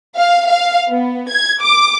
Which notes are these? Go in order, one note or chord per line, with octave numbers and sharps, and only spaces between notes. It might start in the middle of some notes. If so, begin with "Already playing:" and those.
F5
F5
B3
G#6
D6